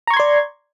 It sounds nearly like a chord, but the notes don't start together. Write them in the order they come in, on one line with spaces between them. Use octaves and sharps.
A#5 C#6 G#6 C6 D5